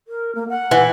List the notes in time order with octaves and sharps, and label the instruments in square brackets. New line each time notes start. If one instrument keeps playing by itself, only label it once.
[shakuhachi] A#4
A#3
F#5
[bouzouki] E3